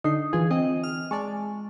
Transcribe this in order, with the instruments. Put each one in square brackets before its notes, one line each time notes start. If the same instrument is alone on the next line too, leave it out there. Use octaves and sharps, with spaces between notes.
[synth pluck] D3 D4 C7 [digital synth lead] D#4
[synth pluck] E3 F4 [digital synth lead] G#4
[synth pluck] C4 [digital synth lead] D#5
[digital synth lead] F6
[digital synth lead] G#3 [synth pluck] D5 A5 C#6